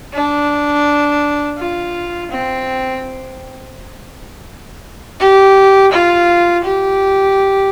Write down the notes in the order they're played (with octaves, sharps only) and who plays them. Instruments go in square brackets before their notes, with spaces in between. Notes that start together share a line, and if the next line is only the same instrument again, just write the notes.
[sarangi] D4
F4
C4
G4
F4
G4